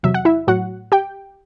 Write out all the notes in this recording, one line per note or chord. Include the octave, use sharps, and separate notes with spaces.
E2 C3 F#3 E5
F#5
E4 E5
A2 F#3 F#4 F#5
G4 G5